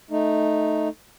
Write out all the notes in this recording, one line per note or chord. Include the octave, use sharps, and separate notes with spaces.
A3 D#4